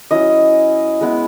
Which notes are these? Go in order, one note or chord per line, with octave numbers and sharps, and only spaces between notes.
F#3 C#4 E4 D#5
G#3 B3 E4